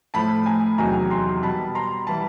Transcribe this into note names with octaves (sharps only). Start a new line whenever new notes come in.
A2 F3 A5 B5
G#5 A#5
E2 C3 D#3 F#3 G#5 A#5
A#5 C6
B2 G3 A5 B5
A#5 C6
E3 G3 A5 B5